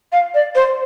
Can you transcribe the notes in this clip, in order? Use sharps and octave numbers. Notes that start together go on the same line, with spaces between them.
F5
D5
C5